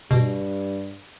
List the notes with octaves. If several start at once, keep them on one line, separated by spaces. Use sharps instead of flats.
G2 B2